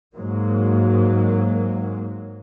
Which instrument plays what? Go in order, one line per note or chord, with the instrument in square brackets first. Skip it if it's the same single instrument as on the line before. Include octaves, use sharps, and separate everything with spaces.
[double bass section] G#2 F#3 A#3